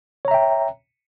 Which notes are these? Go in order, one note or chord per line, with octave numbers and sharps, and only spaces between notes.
C#5 E5 G5 A#5